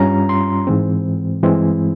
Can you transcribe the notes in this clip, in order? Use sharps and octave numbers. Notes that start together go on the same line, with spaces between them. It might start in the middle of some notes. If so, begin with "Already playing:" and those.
Already playing: G2 G3 C#4 F4 A#5
C6
G#2 E3 G#3 C4
G2 E3 G#3 C4 E4